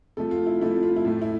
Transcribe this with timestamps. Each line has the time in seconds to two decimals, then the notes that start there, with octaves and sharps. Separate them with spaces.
0.17 C3 F3 A3 A4
0.31 F4
0.47 E4
0.61 C3 F3 A3 E4
0.83 F4
0.96 E4
1.05 A2 F3 A3
1.22 E4